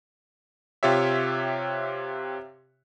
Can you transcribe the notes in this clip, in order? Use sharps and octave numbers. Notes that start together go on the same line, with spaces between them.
C3 F4 G4 C#5 E5